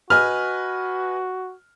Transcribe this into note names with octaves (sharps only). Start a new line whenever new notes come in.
F#4 B4 D#5 G#5 F6